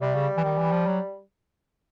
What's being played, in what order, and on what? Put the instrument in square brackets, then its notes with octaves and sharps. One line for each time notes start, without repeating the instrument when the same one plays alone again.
[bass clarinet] C3 [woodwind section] G3
[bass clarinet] C#3
E3
D#3
E3
F3
F#3